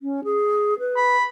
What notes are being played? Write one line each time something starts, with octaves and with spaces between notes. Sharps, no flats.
C#4
G#4
B4
B5